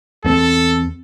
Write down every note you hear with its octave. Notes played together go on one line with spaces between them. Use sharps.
E2 A#3 C4 A4